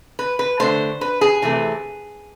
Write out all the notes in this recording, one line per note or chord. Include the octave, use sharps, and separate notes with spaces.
B4
B4
D3 A3 C5
B4
G#4
C3 E3 A3